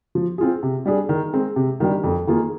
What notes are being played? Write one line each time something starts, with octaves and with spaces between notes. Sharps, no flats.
F3
C4 F4 G#4
C3
G3 D4 G#4
D#3
G#3 C4
C3
D#3 G3 D4 G4
F2
D#3 A#3 F4 G#4